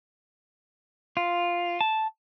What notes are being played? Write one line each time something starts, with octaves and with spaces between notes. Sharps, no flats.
F4
A5